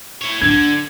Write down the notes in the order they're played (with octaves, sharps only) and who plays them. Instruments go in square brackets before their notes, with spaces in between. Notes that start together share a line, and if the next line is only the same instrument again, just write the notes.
[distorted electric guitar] E4 C#5
[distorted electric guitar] D3 [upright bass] D4 [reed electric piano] G#6